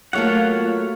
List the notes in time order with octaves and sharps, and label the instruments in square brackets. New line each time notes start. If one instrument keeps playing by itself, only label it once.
[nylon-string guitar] F#3 A3 A#3 [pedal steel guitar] F4 C#5 F#5